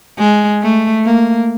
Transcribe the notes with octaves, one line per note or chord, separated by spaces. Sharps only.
G#3
A3
A#3